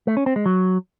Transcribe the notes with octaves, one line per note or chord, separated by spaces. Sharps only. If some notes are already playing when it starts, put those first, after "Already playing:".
A3
C#4
C4
G#3
F#3